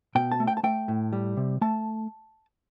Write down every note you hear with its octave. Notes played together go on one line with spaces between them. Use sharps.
B2 G5
A5
A3
G5
A5
A3 G5
A2
G3
C3
A3 A5